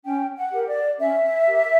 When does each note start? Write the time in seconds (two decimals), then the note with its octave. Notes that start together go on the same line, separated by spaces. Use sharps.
0.04 C#4 G5
0.36 F#5
0.52 G4 A#4
0.67 D5
0.99 C#4 E5
1.47 G4 A#4